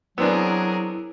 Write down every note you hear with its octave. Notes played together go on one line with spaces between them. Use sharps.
F#3 B3 C4 D4 E4 G#4 A#4